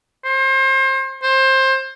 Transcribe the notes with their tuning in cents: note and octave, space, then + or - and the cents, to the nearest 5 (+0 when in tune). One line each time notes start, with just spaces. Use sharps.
C5 +30
C5 +20